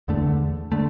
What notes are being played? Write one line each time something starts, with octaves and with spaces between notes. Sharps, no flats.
E2 D3 A3
D3 A3